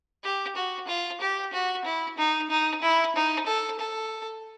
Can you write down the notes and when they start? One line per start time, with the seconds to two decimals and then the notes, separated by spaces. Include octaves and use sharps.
0.24 G4
0.56 F#4
0.88 F4
1.21 G4
1.53 F#4
1.85 E4
2.18 D#4
2.51 D#4
2.82 E4
3.15 D#4
3.47 A4
3.79 A4